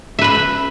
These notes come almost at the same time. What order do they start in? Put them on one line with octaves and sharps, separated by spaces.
E5 B4 B5